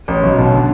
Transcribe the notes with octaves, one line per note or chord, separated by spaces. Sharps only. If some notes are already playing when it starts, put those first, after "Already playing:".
A1
B1
B2
D3